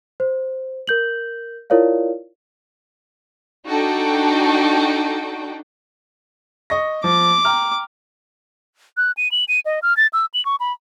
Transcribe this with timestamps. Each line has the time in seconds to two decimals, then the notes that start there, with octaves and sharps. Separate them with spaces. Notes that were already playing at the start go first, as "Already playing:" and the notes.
0.20 C5
0.87 A#4 G6 F#7
1.70 E4 F4 A#4 C#5 D5 F5
3.68 D4 D#4 F#4 A4 G5
6.70 D#5 C#6 A#6
7.04 F3 D6
7.45 G5 A#5 F6
8.97 F#6
9.17 D#7
9.31 F#7
9.48 D#7
9.65 D#5
9.82 F6
9.97 A6
10.13 E6
10.34 F#7
10.45 C#6
10.60 B5